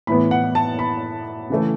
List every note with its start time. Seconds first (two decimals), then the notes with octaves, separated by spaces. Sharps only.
0.07 A2 E3 B3 B5
0.31 F#5
0.55 A5
0.79 B5
1.50 C#3 E3 A3